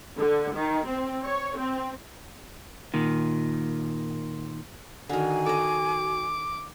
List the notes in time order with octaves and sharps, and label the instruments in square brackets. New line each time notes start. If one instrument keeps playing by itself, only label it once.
[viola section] D3
D#3
C4
C#5
C4
[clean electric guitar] A#2 D#3
[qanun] D3 D#3 [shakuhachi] F#4 [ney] G#5
[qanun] A4 D#5 [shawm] D6